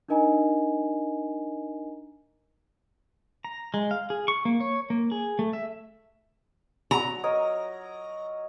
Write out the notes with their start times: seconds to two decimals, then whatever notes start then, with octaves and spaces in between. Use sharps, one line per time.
0.08 D4 D#4 A#4 D#5 G#5 A#5
3.45 A#5
3.74 G#3
3.91 F5
4.10 G#4
4.28 C#6
4.45 A#3
4.60 C#5
4.90 A#3
5.12 G#4
5.39 A3
5.53 E5
6.91 F#3 A#5
7.24 A#4 C#5 D#5